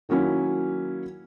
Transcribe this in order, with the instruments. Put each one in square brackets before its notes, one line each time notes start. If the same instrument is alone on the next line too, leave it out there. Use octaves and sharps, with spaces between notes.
[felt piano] D#3 F#3 A#3 C#4 E4